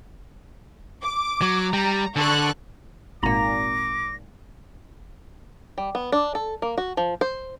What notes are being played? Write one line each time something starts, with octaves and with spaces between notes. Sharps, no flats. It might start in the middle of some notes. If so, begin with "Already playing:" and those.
D6
F#3
G3 A#5
D3 A4 C#6 F#6
G#1 A#2 A#5 D6 A#6
G3
B3
D4
A4
A#3
F#4
F3
C5